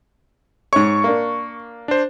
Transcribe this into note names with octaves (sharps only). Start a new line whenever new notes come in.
G#2 C#5 C#6
A#3 D4
D4 C5